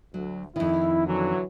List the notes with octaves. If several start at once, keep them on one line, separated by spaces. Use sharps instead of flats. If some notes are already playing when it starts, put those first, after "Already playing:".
D2 F#3
F2 D#3 E4
D3 E3 F#3